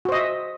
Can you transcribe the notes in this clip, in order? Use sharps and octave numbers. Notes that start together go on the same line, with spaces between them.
F#4 C5 D#5 E5